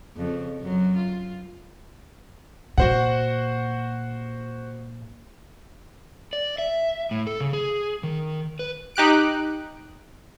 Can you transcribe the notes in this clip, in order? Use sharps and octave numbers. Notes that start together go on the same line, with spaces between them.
F2 C#3
F#2 F#3
F4
A#2 F#4 C5 F#5
D5
E5
A2
A4
C#3
G#4
D#3
B4
D#4 G4 F#6 D7